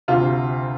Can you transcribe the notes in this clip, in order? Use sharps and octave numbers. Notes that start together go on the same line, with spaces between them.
D2 C3 F4